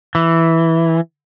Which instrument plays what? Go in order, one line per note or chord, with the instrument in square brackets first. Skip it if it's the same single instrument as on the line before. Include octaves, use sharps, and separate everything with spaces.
[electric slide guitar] E3